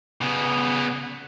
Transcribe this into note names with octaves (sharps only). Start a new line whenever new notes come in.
C#3 B3